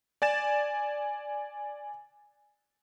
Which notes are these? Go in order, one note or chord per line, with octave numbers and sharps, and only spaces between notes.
D5 G#5 A6 E7